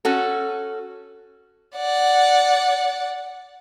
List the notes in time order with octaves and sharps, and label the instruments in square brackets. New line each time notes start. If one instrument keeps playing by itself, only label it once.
[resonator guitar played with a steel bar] C#4 F#4 A4
[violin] D5 F#5